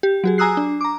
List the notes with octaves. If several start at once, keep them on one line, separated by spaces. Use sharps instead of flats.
G4
F#3 F#4 G#4
G#5 A#5 D#6 E6 F#6 C7
D4
A#5 D6